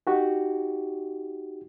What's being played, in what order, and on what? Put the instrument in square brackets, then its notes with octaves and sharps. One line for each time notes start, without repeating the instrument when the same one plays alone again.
[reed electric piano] D#4 F#4 G4